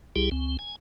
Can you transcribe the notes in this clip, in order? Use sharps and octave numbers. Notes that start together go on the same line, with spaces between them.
C2 G3 E4 G4 G#4
C#2 C4
G#5